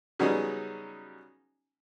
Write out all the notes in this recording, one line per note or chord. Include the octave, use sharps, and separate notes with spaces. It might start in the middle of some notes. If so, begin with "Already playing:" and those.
C#3 F#3 G3 B3 C#4 D#4